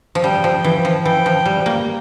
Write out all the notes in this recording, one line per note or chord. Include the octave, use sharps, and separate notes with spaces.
F3
G3 G5
F3
E3
F3
E3 G5
F3
G3
A#3